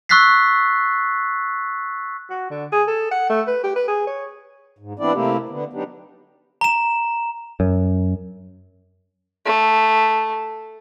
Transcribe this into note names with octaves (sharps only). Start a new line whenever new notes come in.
C#6 E6 F#6 A6 B6 C7
F#4
D3
G#4
A4
F#5
A3
B4
G4
B4
G#4
C#5
G#2
E3 B3 C4 D4 E4 D5
C3 A3 A#3 C4 E4 G4
D3 B3
F#3 B3 D4 D#4 G4
A#5 E7
F#2
A3